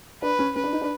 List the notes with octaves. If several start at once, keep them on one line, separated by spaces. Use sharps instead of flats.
D4 B4
C#4
C#4 B4
D4
D#4
D4